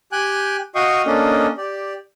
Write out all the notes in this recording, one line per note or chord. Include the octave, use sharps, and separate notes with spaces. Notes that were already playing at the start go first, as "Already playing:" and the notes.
G4 G5 G#5 F#6
F#4 D#5 F5 G5 C#6 D#6
A#3 C#4 D4 A4 D#5
G4 D5